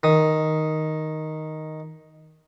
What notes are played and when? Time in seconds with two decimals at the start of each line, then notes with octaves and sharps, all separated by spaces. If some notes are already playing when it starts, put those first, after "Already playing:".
0.03 D#3 D#6